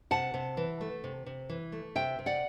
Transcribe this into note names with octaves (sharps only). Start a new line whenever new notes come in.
C3 F#5 A5
C3
E3
A3
C3
C3
E3
A3
C3 E5 G5
C3
D5 F#5